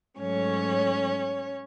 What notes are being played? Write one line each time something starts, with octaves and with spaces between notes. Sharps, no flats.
G#2 F#3 A3 C#4 C#5